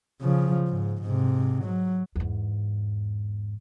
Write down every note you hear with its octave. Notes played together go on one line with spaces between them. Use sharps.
C#3 F3
G#2
G#2 C3
F#3
E2 G#2